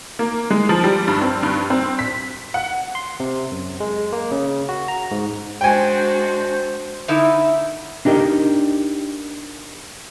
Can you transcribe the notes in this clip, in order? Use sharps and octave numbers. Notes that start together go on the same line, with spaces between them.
A#3
G#3
F3
G3
G2
C4
G2
C4
B6
F#5
C6
C3
F#2
G#3
A#3
C#3
F#4
A#5
G#2
G#3 D4 F#4 C5 G5 G#5
D3 D#4 E4 A#4 E5
D4 D#4 G4 A#4 D#5